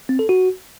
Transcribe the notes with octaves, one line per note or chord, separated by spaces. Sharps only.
C4
A4
F#4